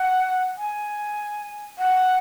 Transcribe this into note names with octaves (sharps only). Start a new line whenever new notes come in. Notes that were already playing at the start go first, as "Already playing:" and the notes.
Already playing: F#5
G#5
F#5